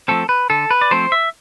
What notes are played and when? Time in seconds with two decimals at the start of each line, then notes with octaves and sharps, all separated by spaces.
0.08 F3 A3 C4 A4
0.29 B4
0.50 D3 A4
0.71 B4
0.81 D5
0.91 F3 A3 C4 C5
1.12 E5